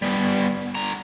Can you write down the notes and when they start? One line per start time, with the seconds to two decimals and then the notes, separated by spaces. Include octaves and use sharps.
0.02 G3 B3
0.75 D3 A#5